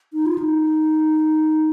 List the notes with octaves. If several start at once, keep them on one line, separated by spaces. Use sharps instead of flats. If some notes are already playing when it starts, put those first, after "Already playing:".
D#4
F4
D#4